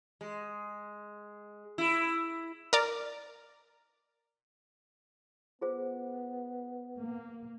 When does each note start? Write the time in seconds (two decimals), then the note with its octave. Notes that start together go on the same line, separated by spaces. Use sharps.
0.21 G#3
1.78 E4
2.73 A#4 D5
5.61 B3 F4 G#4 C5
6.99 A#3